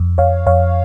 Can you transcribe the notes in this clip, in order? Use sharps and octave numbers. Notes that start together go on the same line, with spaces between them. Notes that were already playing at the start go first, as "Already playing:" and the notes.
Already playing: F2
F2 C#5 F5
F2 C#5 F5